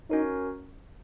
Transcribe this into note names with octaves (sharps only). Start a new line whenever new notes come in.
C#4 D#4 F#4 A#4 C#5